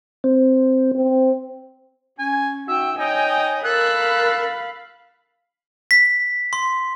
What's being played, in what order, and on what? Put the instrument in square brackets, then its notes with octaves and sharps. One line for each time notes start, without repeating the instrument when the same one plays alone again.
[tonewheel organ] C4
[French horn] C4
[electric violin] C#4 [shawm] G#5
[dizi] D#4 [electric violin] F#4 G5 [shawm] E5 [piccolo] E6
[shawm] D#4 [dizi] C#5 [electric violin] D#5 G#5 [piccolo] G5
[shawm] A4 [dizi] A#4 [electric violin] F5 B5 [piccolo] F#6
[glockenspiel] B6
C6